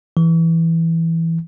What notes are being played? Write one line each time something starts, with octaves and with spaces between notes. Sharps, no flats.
E3